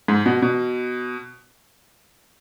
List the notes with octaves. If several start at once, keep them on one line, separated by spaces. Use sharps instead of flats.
G#2
B2
B2